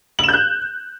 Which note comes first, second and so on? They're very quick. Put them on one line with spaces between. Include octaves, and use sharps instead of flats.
F#7 E7 G6 F#6